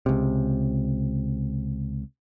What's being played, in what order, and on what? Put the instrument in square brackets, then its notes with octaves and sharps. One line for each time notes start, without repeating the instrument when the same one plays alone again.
[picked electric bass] C#2 C3